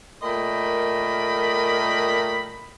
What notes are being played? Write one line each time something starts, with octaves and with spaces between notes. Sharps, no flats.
A#2 A3 A#4 D#5 G5 B5